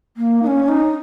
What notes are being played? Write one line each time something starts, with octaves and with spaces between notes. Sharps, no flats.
A#3
D#4
C#4
D#4